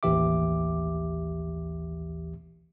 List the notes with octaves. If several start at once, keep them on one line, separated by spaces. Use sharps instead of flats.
A1 D#2 E3 G4 E5 D6